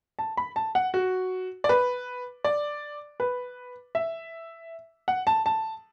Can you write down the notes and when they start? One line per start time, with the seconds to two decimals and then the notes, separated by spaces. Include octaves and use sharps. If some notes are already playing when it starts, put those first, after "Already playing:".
0.19 A5
0.37 B5
0.56 A5
0.75 F#5
0.94 F#4
1.64 D5
1.69 B4
2.44 D5
3.20 B4
3.95 E5
5.08 F#5
5.27 A5
5.46 A5